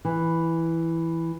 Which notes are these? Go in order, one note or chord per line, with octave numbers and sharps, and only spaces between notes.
E3